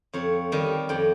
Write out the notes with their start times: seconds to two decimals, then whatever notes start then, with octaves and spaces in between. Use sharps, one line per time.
0.13 F2 C#5
0.52 D#3 G3
0.89 F2 G5